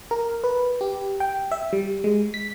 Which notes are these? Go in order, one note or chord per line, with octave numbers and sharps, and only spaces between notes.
A#4
B4
G4
G5
E5
G3
G#3
B6